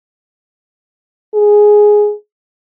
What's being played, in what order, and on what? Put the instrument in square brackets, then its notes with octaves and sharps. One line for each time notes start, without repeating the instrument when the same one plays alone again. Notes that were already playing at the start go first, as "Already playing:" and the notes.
[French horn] G#4